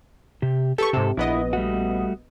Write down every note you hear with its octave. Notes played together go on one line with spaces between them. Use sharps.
C3 G4
G4 A4 B4 C#6
G#2 C3 A4
A#1 B3 E4 D#5
G3 A3 F#4